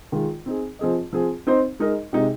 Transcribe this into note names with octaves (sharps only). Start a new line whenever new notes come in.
D#3 G#3 F4
C4 D#4 G#4
F3 C4 G#4 D#5
F3 C4 G#4
C4 D#4 C5
G#3 D#4 A#4 D#5
C3 G#3 D#4